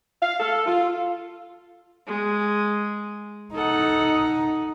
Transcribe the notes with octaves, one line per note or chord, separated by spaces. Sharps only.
F5
A4
F4
G#3
D#4 A4 F#5